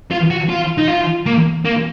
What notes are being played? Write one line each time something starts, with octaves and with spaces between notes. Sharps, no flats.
F4
F#4
F4
D#4
F4
A#3
A#3